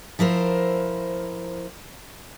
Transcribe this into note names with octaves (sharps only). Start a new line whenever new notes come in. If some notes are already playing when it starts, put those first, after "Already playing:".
F3 E4 A#4 C5